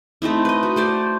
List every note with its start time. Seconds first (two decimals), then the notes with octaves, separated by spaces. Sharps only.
0.22 A3 C4 D#4 E4
0.45 B4 D#5
0.63 F#4
0.76 A3 C5 D5